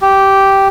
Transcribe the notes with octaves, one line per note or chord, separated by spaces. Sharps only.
G4